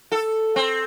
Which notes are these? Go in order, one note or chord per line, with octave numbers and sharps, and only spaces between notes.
A4
C4